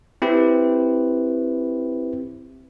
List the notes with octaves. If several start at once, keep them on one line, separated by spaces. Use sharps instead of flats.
C4 E4 G4 B4